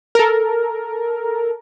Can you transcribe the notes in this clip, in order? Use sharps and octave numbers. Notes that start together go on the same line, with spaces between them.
A4 A#4